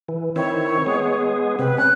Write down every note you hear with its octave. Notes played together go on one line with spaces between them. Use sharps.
E3
D#3 C4 E4 C#5
G#3 B3 G#4
C3 C4 B4
C#4 F#6